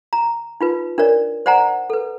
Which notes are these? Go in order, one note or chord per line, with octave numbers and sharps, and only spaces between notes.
A#5
D#4 F4 B4
D4 A#4 C#5 D5
C5 D5 F#5 G#5 A#5
A4 B4